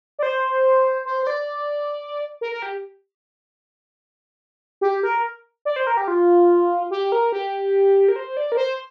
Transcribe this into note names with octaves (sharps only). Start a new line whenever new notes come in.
D5
C5
C5
C5
D5
A#4
A#4
G4
G4
A#4
D5
C5
A#4
G4
F4
G4
A#4
G4
A#4
C5
D5
A#4
C5